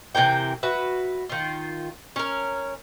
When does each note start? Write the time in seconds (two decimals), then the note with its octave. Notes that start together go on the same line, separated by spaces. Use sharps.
0.15 C3 E3 A#4 G5
0.63 F#4 B4 E5
1.29 D#3 F4
2.16 C#4 A#4